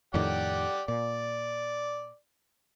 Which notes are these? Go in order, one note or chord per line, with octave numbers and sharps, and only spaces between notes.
F2 A2 D#3 G4 D5 F#5
A#2 D5